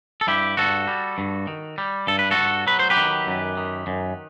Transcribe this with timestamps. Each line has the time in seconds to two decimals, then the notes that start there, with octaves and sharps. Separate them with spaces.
0.21 A4
0.27 G2 E4 G4
0.57 G2 F#4 A4
0.88 G3
1.18 G2
1.47 D#3
1.78 G3
2.07 G2 A4
2.19 B4
2.31 F#4 A4
2.37 G2
2.67 F#3 B4
2.79 C5
2.90 G4 B4
2.97 D#3
3.27 F#2
3.57 D#3
3.87 F#2